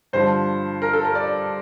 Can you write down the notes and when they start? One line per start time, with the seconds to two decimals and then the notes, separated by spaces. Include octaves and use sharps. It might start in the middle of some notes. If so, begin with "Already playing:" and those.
0.13 G2 D3 F3 C5
0.82 A#4
0.93 A4
1.05 A#4
1.15 D5